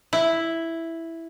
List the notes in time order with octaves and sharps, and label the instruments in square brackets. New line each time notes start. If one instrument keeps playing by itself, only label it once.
[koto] E4